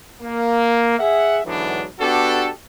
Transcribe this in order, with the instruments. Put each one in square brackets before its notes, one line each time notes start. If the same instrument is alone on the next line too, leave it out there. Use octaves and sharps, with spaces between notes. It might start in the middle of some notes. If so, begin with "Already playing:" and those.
[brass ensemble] A#3
G#4 E5 F#5
G#2 D3 E3 F#3 B3 D4
B3 D4 F#4 G4 A4